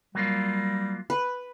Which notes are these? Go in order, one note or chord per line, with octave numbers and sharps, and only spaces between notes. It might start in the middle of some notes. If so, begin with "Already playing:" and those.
F#3 G3 A#3 F4
B4